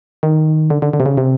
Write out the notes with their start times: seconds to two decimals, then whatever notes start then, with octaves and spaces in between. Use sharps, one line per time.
0.23 D#3
0.70 D3
0.82 D3
0.93 D3
1.00 C3
1.06 C#3
1.17 C3